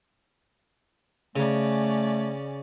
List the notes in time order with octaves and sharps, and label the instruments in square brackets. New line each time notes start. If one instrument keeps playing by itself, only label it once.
[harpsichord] C#3 [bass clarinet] A3 [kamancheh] C#4 D5